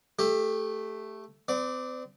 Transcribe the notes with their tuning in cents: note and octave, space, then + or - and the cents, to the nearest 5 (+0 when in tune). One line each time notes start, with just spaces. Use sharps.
A3 +0 G4 +20
C4 -40 D5 +0